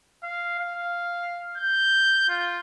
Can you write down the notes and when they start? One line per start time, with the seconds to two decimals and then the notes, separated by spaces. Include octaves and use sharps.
0.23 F5
0.59 F5
1.57 G6
2.29 F4